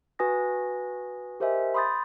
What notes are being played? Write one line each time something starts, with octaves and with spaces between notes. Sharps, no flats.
F#4 B4 G#5 D#6 A#6
G4 A#4 C5 D#5 E5 G#5
B5 C6 D#6 G6 A6